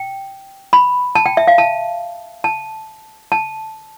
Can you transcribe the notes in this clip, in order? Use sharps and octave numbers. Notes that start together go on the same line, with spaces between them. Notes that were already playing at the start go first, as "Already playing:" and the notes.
Already playing: G5
B5
A5
G5
E5
F5
A5
A5
A5